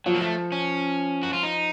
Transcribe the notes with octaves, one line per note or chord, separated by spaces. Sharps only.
F3 F#3
A#3
A3
C#4
F#4
F4
D#4